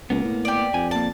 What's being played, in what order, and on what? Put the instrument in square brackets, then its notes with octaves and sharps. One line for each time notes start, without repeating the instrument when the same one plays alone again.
[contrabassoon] C#2 [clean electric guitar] A#3 B3
[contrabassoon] A2
[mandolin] G4 D5
[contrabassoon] F2 [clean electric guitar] G#5
[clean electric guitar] A#3 D5 [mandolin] A5